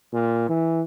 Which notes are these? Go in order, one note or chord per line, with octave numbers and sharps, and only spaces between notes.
A#2
E3